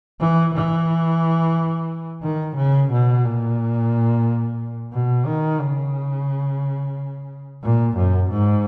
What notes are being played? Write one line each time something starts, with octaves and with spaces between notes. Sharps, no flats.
E3
E3
D#3
C#3
B2
A#2
B2
D#3
C#3
A#2
F#2
G#2